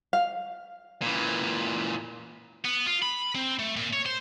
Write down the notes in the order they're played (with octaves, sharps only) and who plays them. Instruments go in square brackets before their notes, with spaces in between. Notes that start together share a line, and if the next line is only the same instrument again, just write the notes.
[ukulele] F5
[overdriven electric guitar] A#2 E3
[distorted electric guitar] B3
F4
B5
C4
A3
A#2
C#5
C5